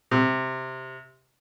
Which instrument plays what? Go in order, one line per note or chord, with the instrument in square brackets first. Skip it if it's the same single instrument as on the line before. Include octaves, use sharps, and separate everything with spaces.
[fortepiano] C3